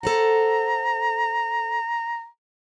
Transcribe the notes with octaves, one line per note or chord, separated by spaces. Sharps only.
A4 C5 F#5 A#5